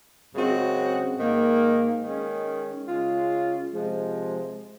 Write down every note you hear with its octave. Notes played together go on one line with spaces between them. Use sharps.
F#2 C#3 G#3 C4 F#4
G#2 D#3 A#3
D#3 G#3 C#4
C#3 G#3 C#4 F4
C3 F3 G#3